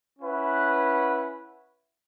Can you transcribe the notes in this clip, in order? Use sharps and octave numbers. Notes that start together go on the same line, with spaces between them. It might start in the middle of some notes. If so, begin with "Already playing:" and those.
C#4 E4 B4 F#5